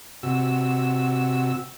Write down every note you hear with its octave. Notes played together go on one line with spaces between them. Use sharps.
C3 F#4 E6